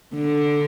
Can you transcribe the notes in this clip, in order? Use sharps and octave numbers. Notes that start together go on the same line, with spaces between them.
D3